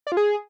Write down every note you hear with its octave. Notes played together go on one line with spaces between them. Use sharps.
D5
F4
G#4